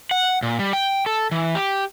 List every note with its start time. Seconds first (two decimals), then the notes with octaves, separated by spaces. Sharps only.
0.11 F#5
0.43 A#2
0.59 G3
0.73 G5
1.06 A4
1.32 E3
1.55 G4